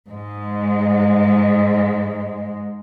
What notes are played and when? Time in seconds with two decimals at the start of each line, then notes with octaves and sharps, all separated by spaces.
0.11 G#2 G#3